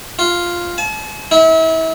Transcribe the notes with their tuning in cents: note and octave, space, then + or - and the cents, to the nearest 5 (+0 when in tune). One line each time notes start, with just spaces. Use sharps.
F4 +0
A5 -45
E4 -35